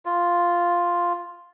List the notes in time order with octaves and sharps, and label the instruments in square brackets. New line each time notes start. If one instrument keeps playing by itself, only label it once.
[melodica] F4